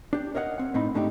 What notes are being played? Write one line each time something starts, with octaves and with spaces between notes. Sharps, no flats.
D4 G4
A#4 C#5 D#5 F5 F#5
C4 F#5
A2 C4 D#4 B5
G#2 A3 D4 D#4 G4